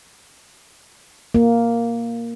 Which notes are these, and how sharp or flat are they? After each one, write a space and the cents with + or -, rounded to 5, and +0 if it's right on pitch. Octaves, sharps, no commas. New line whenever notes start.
A#3 +0